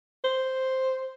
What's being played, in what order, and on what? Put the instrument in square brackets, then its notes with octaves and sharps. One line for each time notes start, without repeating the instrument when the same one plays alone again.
[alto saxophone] C5